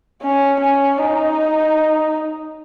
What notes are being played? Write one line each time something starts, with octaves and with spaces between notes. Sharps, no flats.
C#4
C#4
D#4